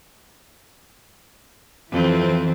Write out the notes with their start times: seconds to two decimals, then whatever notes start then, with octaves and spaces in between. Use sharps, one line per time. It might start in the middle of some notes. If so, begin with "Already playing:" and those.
1.92 F2 E3 C4